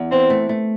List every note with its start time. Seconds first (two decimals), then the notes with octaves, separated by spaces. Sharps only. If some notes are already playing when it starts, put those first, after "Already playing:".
Already playing: E2
0.11 E3 C4
0.30 A3
0.49 A3